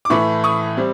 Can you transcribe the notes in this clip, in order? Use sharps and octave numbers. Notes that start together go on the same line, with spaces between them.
D6
A2 E3 A3 B5 C#6
C#6 D#6
G3 C4